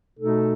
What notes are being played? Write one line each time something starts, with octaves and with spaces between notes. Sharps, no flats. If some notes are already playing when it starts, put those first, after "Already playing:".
B2 A3 D#4 A4